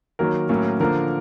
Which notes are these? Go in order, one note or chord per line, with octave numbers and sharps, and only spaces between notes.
D#3 F#3 A#3 A#4
A2 F#3 A#3 C#4
D3 F3 A#3 A#4